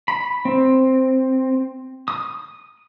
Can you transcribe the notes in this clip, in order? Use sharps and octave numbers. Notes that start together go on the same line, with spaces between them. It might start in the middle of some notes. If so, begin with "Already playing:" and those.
B5
C4
D#6